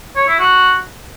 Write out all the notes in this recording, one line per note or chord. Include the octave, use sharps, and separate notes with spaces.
C#5
E4
F#4